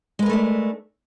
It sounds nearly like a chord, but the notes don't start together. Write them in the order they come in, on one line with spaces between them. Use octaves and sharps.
G#3 B4 A#4 A3 D4